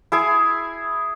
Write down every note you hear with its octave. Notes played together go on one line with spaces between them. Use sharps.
E4 G#4 G#5